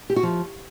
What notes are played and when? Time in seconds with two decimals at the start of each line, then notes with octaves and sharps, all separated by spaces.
0.10 G4
0.16 F#4
0.23 F3